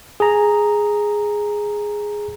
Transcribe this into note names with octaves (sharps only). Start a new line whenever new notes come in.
G#4 A#5